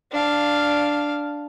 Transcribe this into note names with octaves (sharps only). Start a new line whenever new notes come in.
D4 F5